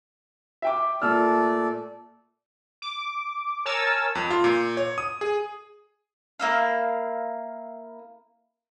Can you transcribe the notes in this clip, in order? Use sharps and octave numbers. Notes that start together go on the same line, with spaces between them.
E5 G5 D6
A#2 A3 D5 E6 F6
D6
A#4 C#5 G#5 A5 E6 A6
F2
F4
A#2
C#5
D#6
G#4
A#3 E4 F5